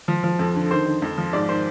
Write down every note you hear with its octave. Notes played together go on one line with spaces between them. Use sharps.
F3
F3
F2
D3
D#3 C5
D#3
F2
F3
G#2 D5
D#3 C5